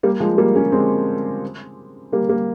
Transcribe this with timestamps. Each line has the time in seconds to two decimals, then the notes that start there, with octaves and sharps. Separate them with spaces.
0.03 G3 A#3
0.20 F3 G#3
0.38 G3 A#3
0.56 A#3 C#4
0.72 G#3 C4
2.12 G3 A#3
2.29 G3 A#3